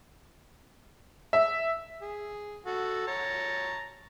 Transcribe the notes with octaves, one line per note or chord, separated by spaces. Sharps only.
E5
G#4
F#4 A4
C#5 A5 A#5